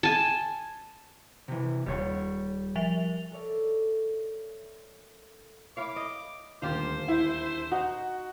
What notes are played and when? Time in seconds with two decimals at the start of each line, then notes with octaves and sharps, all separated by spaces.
0.03 G#5 A5
1.48 C3 E3
1.86 D#1 G3 C#5
2.76 F3 E5 F7
3.31 A4 A#4 C#5 D5 E5
5.77 E4 C#5 F5 D6
5.96 D#5
6.62 D#1 D2 F4 G4 C5 F5
7.08 E4
7.71 D#4 F#4